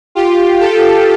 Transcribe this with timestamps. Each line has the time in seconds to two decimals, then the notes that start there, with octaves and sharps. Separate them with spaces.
0.15 F4 G4
0.60 G4 A4